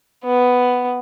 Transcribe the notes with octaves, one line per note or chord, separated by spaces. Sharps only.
B3